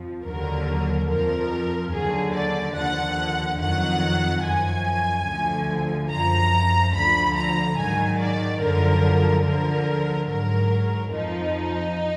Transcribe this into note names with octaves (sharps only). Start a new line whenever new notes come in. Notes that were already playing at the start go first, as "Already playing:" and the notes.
Already playing: F2 F3
D#2 D3 F#3 A#4
F2 F3 A#4
D#2 D3 F#3 G#4
D5
D#2 D3 F3 F#5
F2 D#3 F#3 F#5
F#2 F3 G#5
D2 D3 F3
F#2 F3 A#5
D2 D3 F3 B5
A#5
G#2 D#3 F#3 G#5
D5
F#2 D3 F3 A#4
D2 D3 F3 A#4
G#2 F#3 A#4
F2 F3 D#4